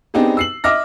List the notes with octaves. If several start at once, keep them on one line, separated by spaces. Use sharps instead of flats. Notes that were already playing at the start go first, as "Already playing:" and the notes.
B3 C4 D4 D#4 G4 G#4
E6 C7 F#7
D#5 E5 D6 F6 A#6